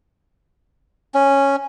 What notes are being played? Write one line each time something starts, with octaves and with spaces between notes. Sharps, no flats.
C#4